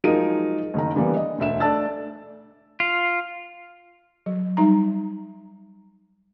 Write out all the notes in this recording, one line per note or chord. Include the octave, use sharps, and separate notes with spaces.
F3 F#3 G#3 D#4 A#4 D#7
F#1 D#3 A#5
D3 E3 G3 A#3 B3
D#5
E1 D2 E5 E7
A3 D4 D5 A5 E6 A6
F4
F#3
G3 D#4 A#5